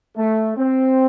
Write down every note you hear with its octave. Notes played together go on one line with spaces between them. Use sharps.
A3
C4